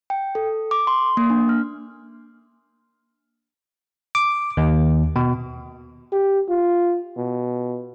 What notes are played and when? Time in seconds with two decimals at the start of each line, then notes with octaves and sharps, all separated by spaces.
0.10 G5
0.35 A4
0.71 D6
0.87 C6
1.17 A#3
1.30 D4
1.49 F6
4.15 D6
4.57 D#2
5.16 B2
6.12 G4
6.49 F4
7.17 B2